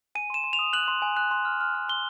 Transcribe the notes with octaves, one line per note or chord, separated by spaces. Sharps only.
G#5 D#7
C6 E7
C6
F7
D#6
F#6 F#7
C6
G#5
F#6
C6
F6
F6
F6
C6 G7